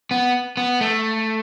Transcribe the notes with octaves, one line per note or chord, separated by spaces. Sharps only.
B3
B3
A3